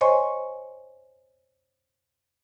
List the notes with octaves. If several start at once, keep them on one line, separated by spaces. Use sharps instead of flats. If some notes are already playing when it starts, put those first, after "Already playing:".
C5 C#5 D#5 G#5 C6 C#6